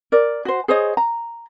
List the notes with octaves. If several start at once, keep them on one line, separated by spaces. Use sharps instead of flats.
A#4 D5
F#4 C5
G#4 C5 C#5 D#5
A#5